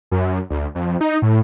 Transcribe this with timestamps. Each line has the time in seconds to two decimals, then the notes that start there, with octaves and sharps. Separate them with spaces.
0.11 F#2
0.50 D2
0.75 F2
1.01 D#4
1.22 A2